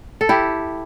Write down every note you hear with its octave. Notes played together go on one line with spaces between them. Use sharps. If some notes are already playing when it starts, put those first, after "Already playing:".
A4
E4 G4